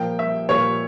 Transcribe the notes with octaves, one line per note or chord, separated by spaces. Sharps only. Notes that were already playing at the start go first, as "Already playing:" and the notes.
Already playing: A#2 F3 A#3 G5
E5
A#2 F3 A#3 C#5